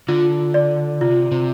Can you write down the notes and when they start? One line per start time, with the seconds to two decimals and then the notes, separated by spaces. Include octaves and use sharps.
0.08 D3 F4
0.54 D5
1.01 C3 F4
1.31 C3